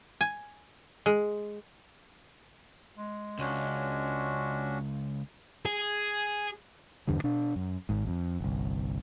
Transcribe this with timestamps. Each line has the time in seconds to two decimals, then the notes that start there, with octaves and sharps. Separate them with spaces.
0.21 G#5
1.06 G#3
2.98 G#3
3.39 C#2 C#4 D4 F#4
5.66 G#4
7.07 E2 G2 D3 G3
7.24 B2 D4
7.56 F#2
7.89 G#1 G#2
8.07 F2
8.40 G1 C2